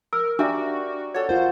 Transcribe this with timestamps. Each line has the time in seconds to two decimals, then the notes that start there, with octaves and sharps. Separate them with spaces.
0.13 A#4 E6
0.39 D4 F#4 G4 A#4 D5 E5
1.14 F#4 A4 C#5
1.29 F4 A#4 C5